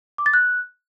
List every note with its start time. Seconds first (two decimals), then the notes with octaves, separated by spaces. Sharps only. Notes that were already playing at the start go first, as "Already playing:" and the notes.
0.18 D6
0.26 A6
0.34 F#6